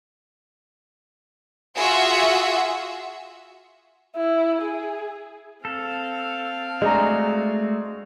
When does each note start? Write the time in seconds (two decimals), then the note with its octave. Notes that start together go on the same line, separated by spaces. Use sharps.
1.78 F4 F#4 G#4 E5 F#5
4.16 E4
4.62 G#4
5.65 C4 A4 F5
6.82 G#3 A3 D4 F#4 G#4 D#5 A#5